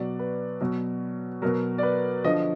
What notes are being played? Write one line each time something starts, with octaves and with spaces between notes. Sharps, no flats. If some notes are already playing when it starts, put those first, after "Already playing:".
Already playing: B2 F#3 D5
B4
B2 F#3
B2 F#3 A#4
D5
B4
D3 F3 D#5